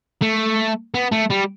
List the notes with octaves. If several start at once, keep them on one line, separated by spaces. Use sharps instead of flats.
A3
B3
A3
G3